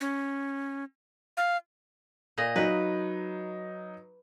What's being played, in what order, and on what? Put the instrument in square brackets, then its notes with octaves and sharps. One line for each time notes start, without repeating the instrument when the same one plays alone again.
[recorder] C#4
F5
[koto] A#2 D#5
[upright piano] F#3 D#4 [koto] B4